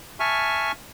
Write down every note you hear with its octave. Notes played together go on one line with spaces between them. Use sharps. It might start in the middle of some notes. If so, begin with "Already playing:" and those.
E5 G#5 A5 C#6 F6